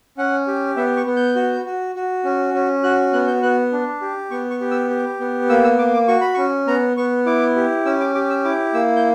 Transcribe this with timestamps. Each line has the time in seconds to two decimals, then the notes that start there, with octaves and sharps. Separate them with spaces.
0.18 C#4 F#5
0.47 G4
0.76 B3 E5
0.97 C#6
1.06 B3
1.16 G6
1.36 F#4
1.65 F#4
1.95 F#4
2.24 C#4
2.54 C#4
2.84 F#4 F#6
3.13 B3 F#6
3.27 G6
3.43 B3 F#6
3.72 D4
4.01 G4
4.31 B3 C#6
4.51 C#6
4.60 G4
4.71 E6
4.90 G4
5.20 B3
5.49 A#3 E6
5.64 E6
5.79 A#3 D6
5.93 D6
6.08 F#4 C#6
6.21 B5
6.34 C#4 C#6
6.67 B3 A#5
6.97 B3 C#6
7.26 E4 D6
7.56 G4
7.85 C#4 E6
8.00 D6
8.15 G4 D6
8.30 E6
8.44 E4 D6
8.74 A#3 E6
8.96 G6